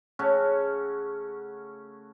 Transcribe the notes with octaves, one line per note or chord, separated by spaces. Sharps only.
C#3 A3 C#4 F#4